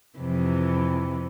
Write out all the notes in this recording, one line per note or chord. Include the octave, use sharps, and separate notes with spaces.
F2 C3 E3